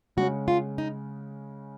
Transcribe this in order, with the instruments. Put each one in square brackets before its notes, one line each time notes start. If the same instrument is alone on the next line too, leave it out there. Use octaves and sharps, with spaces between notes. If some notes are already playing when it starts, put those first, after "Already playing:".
[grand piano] C#3 G#3 C#4 [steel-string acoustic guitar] F#4
[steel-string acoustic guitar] F4
D#4